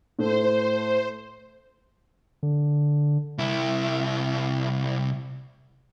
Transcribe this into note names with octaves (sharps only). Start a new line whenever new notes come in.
A2 A3 C5
D3
C2 E4